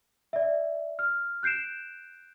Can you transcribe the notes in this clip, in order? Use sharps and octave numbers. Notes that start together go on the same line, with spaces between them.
D5 E5
F6
F#6 G6 C7 D7 E7